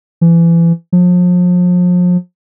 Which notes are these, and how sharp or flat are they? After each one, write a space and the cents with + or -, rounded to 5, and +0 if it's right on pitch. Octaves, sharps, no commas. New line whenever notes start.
E3 +30
F3 +35